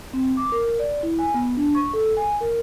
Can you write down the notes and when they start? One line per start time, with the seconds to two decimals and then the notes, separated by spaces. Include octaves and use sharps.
0.13 C4
0.37 D6
0.52 A#4
0.79 D5
1.03 E4
1.19 G#5
1.34 B3
1.57 D4
1.75 C#6
1.93 A4
2.17 G#5
2.41 A#4